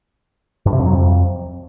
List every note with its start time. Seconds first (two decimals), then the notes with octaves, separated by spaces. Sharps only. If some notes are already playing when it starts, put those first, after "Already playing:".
0.66 G2
0.73 C3
0.79 F2
0.86 F#3
0.93 F2